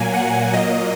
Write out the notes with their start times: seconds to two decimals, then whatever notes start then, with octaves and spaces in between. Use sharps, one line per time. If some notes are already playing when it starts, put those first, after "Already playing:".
Already playing: A#2 F#3 A#3 G#5
0.14 F#5
0.53 A#2 F#3 A#3 D#5